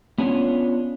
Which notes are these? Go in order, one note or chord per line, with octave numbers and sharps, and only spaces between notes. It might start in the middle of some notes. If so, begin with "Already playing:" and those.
B3 C#4 D4 F4 C#5